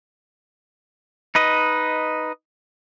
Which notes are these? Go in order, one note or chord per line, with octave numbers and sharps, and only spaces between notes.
D#4 B4 D#5